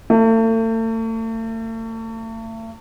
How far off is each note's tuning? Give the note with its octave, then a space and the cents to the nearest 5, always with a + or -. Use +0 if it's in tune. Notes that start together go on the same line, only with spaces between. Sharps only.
A3 +40